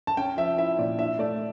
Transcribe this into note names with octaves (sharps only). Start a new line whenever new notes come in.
A5
C#4 G5
F3 E5
E4 E5
A#2 D5
D4 E5
A3 D5